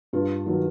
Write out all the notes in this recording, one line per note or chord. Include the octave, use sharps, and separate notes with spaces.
G2 F4
D#3 F#3